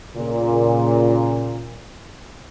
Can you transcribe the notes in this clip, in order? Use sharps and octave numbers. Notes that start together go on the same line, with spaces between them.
A#2 C#3